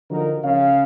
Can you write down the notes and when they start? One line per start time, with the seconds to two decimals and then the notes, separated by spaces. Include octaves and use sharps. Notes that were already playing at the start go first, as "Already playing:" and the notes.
0.10 D3 F3 D#4 F#4 A#4
0.43 C#3 F5